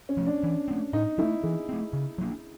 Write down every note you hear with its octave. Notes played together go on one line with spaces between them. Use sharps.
C#4
F3 A3
D4
E3
A3 C4
A2 D#4
F#3 E4
A3
E3 G#4
A3 C4
C#3
F#3 A#3 D4